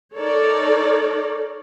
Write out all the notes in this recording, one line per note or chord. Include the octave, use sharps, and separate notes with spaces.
D#4 A4 A#4 C#5 D5